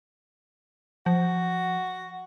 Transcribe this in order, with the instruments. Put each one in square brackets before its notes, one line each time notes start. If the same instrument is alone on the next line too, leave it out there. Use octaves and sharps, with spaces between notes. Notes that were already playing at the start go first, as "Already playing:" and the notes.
[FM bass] F3 [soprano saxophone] F#4